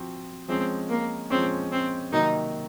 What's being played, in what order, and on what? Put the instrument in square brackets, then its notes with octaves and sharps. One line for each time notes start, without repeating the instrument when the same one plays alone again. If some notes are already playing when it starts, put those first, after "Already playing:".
Already playing: [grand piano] F3 C4 F#4
[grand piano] F3 G#3 C#4 [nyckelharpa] C4
[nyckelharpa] A#3
[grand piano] F3 G#3 C#4 [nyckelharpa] C4
[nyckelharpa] C4
[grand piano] C3 D#3 F#3 A#3 [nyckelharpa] D#4